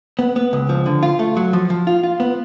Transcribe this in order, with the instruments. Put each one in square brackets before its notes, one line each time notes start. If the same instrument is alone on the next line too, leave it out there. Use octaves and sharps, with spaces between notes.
[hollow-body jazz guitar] B3
B3
C#2
F3
D3
F4
A3
F#3
F3
F3
F4
F4
B3